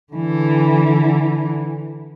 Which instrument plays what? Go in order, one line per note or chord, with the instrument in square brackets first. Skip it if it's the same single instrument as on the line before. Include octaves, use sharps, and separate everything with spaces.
[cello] D3 E3